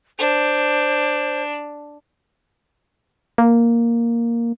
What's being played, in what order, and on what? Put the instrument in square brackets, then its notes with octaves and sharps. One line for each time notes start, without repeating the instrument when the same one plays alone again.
[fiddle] D4 [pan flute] C5
[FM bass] A#3